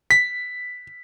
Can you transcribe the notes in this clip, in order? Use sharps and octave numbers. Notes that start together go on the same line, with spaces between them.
B6